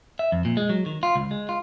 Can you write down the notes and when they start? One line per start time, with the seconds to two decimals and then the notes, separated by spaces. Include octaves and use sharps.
0.19 E5
0.32 F2
0.45 A#2
0.57 G#3
0.69 F#3
0.86 D#3
1.03 F4
1.16 C#2
1.31 G#3
1.49 F4